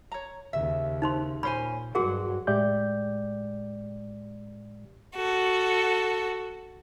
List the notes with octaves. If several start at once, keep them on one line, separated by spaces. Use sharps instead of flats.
C#5 A#5
D#2 C#3 E5
D#4 C5 C6
A#2 C#4 C5 G#5 B5
G2 F#3 F#4 G#4 A#4 F#5
A2 G#3 G4 D5 E5 G6
F#4 A4